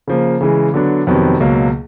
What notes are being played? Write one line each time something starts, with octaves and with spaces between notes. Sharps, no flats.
C#3 F3 A#3
C#3 E3 G#3
D3 F#3 B3 D4
F2 C3 D#3 F#3 B3
C#2 B2 F#3 A#3